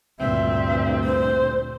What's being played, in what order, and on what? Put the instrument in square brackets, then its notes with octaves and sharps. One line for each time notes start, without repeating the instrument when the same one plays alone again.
[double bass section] D2 G2 A#2 [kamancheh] C4 [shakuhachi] E5
[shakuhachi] C5